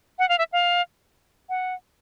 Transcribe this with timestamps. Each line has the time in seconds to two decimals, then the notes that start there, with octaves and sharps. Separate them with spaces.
0.19 F#5
0.29 F5
0.38 E5
0.53 F5
1.49 F#5